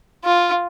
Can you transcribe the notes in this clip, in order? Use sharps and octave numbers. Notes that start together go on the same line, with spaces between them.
F4